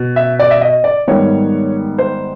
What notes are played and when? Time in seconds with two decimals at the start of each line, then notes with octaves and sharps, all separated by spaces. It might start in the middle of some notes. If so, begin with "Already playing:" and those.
Already playing: B2
0.16 E5
0.39 D5
0.51 E5
0.61 D#5
0.84 D5
1.07 G#2 D#3 G3 B3 C#5
1.98 C5